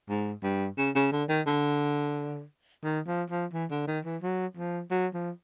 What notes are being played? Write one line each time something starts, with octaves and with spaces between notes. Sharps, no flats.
G#2
G2
C#3
C#3
D3
D#3
D3
D#3
F3
F3
E3
D3
D#3
E3
F#3
F3
F#3
F3